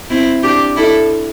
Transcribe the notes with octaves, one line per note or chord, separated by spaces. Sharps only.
C4 E4
D4 G4
E4 A4